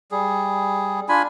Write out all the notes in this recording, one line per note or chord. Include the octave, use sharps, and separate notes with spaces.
G3 G#4
D4 F4 G#5 B5